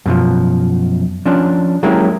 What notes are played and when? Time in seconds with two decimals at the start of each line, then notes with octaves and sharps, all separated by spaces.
0.06 F#2 B2 F3
1.26 F3 C#4 D4
1.83 F#3 G#3 A#3 C#4 E4 G4